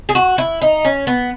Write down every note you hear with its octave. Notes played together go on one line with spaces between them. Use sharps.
G#4
F#4
E4
D#4
C#4
B3